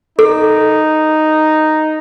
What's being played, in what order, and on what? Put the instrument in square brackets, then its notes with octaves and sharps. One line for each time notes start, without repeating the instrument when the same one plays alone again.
[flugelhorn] D#4 [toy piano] A4